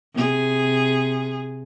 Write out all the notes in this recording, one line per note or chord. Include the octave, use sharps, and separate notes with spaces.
C3 G#4